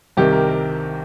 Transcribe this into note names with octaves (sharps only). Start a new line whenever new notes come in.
C2 C3 D#3 G4
A#4
A#4